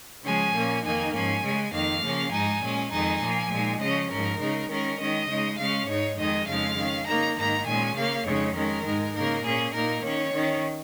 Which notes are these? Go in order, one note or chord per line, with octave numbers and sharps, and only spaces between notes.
C#3 F3 G#3 C#4 G#5
A#2 A#3 C#4
F2 D#3 A#3 D#4 G#5
G#2 F3 C#4 G#5
C#3 G#3 C#4
F2 D#3 A#3 F5
C#3 F3 A#3 C#4
G#2 G#3 D#4 G#5
A#2 G#3 C#4
F2 D#3 G#3 D#4 G#5
A#2 F3 A#3
A#2 G#3 D#4
C#3 F3 C#4 D#5
G#2 F3 C#4 A#4
C#3 G#3 D#4
D#3 G#3 C#4 A#4
D#3 G#3 C#4 D#5
C#3 G#3 D#4
C#3 G#3 C#4 F5
G#2 G#3 D#4 C#5
F2 D#3 G#3 D#4 D#5
F2 C#3 F3 G#3 D#4 F5
D#3 C#4
C#3 A#3 D#4 A#5
G#2 D#3 A#3 D#4 A#5
A#2 G#3 C#4 G#5
C#3 A#3 C#4 F5
F2 C#3 G#3 D#4 C#5
D#3 G#3 C#4 A#4
G#2 G#3 D#4
C#3 A#3 D#4 A#4
A#2 A#3 C#4 G#4
A#2 A#3 D#4 A#4
D#3 C#4 C#5
D#3 C#4